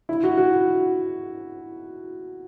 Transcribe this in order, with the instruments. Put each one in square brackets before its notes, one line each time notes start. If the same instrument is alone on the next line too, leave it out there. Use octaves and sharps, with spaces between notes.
[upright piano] E4
F#4
F#4